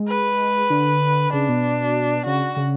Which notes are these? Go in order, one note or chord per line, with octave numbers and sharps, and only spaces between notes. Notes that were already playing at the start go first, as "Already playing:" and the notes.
Already playing: G#3
B4
D3
C#3 D4
B2
C#3 F#4
C#3